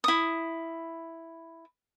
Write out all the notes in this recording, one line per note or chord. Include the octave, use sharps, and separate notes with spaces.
E4 D#6